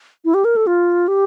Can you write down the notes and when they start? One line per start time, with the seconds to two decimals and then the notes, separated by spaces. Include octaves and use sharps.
0.25 E4
0.34 G4
0.45 A#4
0.56 A4
0.67 F4
1.08 G4